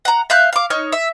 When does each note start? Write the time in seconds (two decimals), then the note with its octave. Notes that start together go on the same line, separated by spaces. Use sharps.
0.05 F#5 A#5
0.30 E5 F5 F#6 G6
0.53 F5 D6
0.70 D#4 C#5 F6
0.92 E5